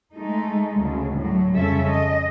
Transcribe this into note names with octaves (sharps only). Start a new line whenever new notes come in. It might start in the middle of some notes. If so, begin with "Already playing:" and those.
G#3 A3 D#4
D2 C#3
A2 F#3
F2 C#3 G3 C#4 A4 E5
D#5